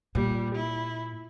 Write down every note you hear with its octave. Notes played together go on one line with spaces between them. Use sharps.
A#2 G3
E4